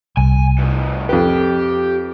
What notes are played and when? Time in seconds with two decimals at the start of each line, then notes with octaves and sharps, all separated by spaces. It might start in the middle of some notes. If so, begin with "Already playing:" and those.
0.17 C2 G#5
0.58 G2 B2
1.09 F2 G4 B4